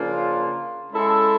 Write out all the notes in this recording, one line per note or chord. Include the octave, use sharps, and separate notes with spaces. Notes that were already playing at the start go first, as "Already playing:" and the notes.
Already playing: C#3 F3 A#3 D4 F4
G#3 C#4 E4 A4